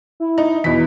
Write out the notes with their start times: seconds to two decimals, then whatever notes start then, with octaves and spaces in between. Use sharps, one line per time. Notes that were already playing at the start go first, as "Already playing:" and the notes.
0.20 E4
0.38 D#4
0.64 E2 B2 E3 B6